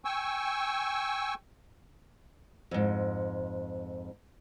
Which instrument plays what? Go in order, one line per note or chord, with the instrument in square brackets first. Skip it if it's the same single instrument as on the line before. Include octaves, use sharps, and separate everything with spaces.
[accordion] G5 G#5 C#6 E6
[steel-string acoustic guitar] F2 G#2